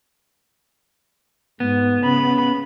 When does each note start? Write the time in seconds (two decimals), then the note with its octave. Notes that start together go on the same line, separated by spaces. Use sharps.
1.60 G#2 B3
2.02 C#3 B5